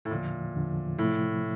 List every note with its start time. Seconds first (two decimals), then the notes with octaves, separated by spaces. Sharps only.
0.05 A2
0.11 E2 A#2 D3 F3
0.55 E2 D3 F3
0.98 A2 C3 F3 A3 E4